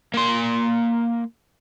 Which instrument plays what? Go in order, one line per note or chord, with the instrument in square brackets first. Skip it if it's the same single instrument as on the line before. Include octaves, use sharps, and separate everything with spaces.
[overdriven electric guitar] A#3 C6